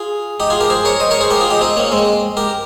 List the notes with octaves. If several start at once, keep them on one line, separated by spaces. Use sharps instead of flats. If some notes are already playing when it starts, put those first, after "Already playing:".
Already playing: F4 G#4
D#4 G4
F4 G#4
G4 A#4
G#4 C5
A#4 C#5
C5 D#5
A#4 C#5
G#4 C5
G4 A#4
F4 G#4
D#4 G4
C4 D#4
A#3 C#4
G#3 C4
G4 A#4